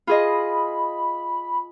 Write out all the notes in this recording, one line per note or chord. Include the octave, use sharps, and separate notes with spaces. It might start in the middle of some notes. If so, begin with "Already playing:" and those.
F4 G#4 D#5 B5